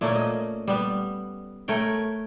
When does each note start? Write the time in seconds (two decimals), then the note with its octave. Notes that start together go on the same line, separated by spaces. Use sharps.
0.01 A#2 A3 A#3 C#4
0.16 D#5
0.68 G3 B3
1.68 A3 A#4 C#5 G5